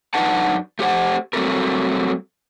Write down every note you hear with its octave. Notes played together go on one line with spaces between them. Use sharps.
F#2 D4 D#4 B4 F#5 A5
A3 G4 C5 F#5
F#3 G3 A3 C4 A4 A#4